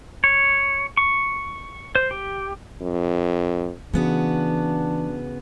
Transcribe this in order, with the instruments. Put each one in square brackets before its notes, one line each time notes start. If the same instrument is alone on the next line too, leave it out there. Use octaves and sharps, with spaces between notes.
[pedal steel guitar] C#5
C#6
C5
G4
[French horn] F2
[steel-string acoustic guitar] C#3 B3 F#4 [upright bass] E3 [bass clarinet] D4